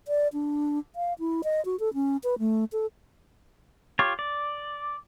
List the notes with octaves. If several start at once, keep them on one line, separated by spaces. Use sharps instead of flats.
D5
D4
F5
E4
D#5
F#4
A4
C#4
B4
A3
A4
F4 G4 C#5
D5